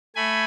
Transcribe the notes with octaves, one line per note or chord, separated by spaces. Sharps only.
A3 G#5 B5